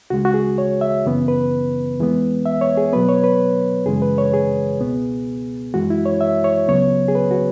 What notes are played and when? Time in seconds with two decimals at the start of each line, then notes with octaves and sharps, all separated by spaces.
0.10 C#2 C#3 G#3 F#4
0.25 F#4
0.34 G#4
0.58 C#5
0.81 E5
1.05 F#2 C#3 E3 B3
1.28 B4
1.99 E2 E3 G#3 B3
2.46 E5
2.61 C#5
2.77 G#4
2.93 B2 F#3 B3 B4
3.09 C#5
3.24 B4
3.86 F#2 C#3 E3 G#3 G#4
4.02 B4
4.18 C#5
4.33 G#4
4.80 C#2 B2 B3
5.74 F#2 E3 G#3 F#4
5.90 E4
6.06 C#5
6.21 E5
6.44 C#5
6.68 C#2 C#3 F#3 B3 C#5
7.08 G#4
7.15 B4
7.31 F#4